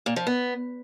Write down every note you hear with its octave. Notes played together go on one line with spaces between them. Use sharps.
A#2
F3
B3